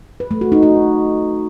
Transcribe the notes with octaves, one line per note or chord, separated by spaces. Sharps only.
B4
A3
F#4
D#4
F#4